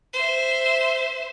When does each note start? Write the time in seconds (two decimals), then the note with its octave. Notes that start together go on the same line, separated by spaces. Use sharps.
0.13 C5 E5